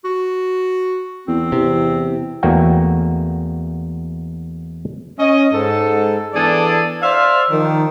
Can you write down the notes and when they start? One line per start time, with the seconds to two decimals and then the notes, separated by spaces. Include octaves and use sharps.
0.04 F#4
1.28 E2 C4
1.52 E2 C3
2.43 E2 A3 A#3 F#4 G5
5.19 C#4 D#5
5.53 G#2 A4
6.34 E3 B3 D4 G#4 A4 D5
7.02 C5 D5 E5 F5
7.51 D#3 F3